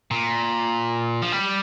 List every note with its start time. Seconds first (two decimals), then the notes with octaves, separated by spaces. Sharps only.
0.11 A#2
1.22 F3
1.32 G3